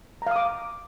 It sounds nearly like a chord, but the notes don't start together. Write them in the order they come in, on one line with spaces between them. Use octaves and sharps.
A#5 F5 D#6 D6